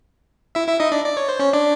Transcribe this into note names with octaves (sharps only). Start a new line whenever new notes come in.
E4 E5
E4 E5
D#4 D#5
D4 D5
D5
C#5
C5
C#4 C#5
D4 D5